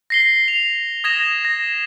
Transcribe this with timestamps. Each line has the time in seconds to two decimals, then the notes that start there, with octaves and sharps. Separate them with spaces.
0.10 A#6 C7 G7
0.48 F7
1.04 D#6 G#6 A#6 E7
1.45 A#6